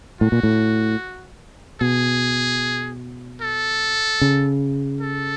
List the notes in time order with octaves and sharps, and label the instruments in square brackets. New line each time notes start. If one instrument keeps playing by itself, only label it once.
[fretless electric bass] A2 [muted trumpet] F#4
[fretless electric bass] A#2
A2
[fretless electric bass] B2 [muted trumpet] G#4
[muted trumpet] A4
[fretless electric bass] C#3
[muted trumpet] A4